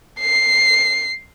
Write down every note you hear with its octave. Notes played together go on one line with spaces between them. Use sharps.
C7